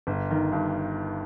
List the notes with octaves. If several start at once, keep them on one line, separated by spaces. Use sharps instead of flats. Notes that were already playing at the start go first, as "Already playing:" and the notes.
G1
D#3
G2